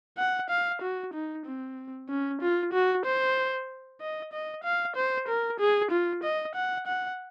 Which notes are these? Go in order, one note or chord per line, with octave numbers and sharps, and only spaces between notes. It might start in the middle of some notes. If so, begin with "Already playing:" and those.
F#5
F5
F#4
D#4
C4
C#4
F4
F#4
C5
D#5
D#5
F5
C5
A#4
G#4
F4
D#5
F#5
F#5